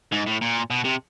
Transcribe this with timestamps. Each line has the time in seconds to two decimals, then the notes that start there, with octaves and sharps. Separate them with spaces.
0.12 G#2
0.27 A2
0.42 A#2
0.71 B2
0.85 C3